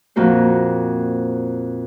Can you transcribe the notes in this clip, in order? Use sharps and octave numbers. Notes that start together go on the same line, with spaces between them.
F2 A#2 A#3 F#4 C5